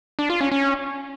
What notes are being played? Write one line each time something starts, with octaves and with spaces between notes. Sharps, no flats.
D4
F4
C#4
C#4